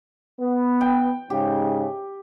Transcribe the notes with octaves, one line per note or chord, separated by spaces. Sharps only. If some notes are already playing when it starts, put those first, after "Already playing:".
B3
G5
G#2 C#3 G4